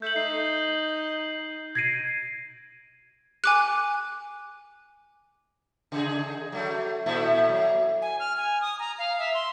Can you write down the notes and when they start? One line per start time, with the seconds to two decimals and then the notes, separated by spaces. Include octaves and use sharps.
0.02 A3 G6 F#7
0.16 D#4 C7
1.75 G#6 A#6 C7 D7 D#7
3.44 G#5 D6 F#6
5.92 C#3 G#4
6.52 F#3 A3
7.06 A#2 A3 E4
7.49 F#3
8.02 G#5
8.20 F6
8.37 G#5
8.62 D#6
8.79 A#5
8.99 F5
9.19 E5
9.34 C6